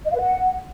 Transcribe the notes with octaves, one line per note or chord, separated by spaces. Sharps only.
D#5
F5
B4
F#5